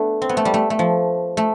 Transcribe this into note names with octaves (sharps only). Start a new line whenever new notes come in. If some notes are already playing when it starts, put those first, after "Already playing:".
Already playing: A3 B3 D4
C4
B3
A3
G3
A3
A3
F3
A3